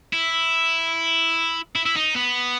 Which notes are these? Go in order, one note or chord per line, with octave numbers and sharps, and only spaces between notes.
E4
E4
E4
D#4
B3